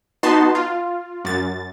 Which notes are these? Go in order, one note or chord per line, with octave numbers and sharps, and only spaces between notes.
B3 D#4 F#4 A5 C6
F4
F#2 A6